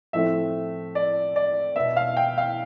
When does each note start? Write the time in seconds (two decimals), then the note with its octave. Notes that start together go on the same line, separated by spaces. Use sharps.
0.13 A2 F3 A3 C4 E5
0.95 D5
1.36 D5
1.76 B2 B3 E5
1.96 F5
2.17 G5
2.38 F5